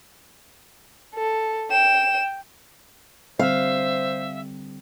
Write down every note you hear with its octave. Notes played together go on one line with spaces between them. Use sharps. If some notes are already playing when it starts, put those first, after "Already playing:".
A4
G5 E7
D3 G3 C4 C5 E5 F5